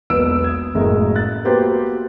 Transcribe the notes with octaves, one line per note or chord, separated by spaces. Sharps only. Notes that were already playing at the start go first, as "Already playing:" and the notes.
E1 B1 A#3 B4 E6 D7
D#6 G#6
F#1 F#2 A2 G#3 A3 A#4
F#6 A6
A#3 B3 F#4 G4 B4 C5